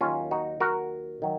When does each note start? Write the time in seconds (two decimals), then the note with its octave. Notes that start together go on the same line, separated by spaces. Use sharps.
0.01 D#2 D#3 F#3 C#4 F4
0.31 D#4 F#4
0.60 F#4 A#4
1.22 D#3 F#3